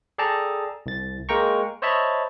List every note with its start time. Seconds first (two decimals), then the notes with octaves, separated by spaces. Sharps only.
0.18 G#4 A4 D5 G5 A5 A#5
0.86 C2 A6
1.29 G#3 A#3 A#4 G5 A#5 C#6
1.82 C5 C#5 D#5 E5 A5 B5